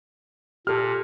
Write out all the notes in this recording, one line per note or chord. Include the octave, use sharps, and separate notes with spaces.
A#2 G4 A4 F6